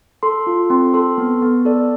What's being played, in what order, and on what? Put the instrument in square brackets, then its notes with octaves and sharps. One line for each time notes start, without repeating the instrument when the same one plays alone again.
[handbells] A4 C6
F4
C4 C6
A4 C6
B3
B3
A4 D5